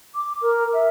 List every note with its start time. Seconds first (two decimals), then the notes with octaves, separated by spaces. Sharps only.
0.15 D6
0.41 A#4
0.73 E5